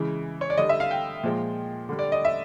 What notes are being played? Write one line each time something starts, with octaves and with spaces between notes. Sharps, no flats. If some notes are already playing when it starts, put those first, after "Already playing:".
Already playing: C#3 E3 G#3
C#5
D5
D3 G3 D#5
E5
F5
G5
A#2 F3 G#3
D3 G3
D5
D#5
E5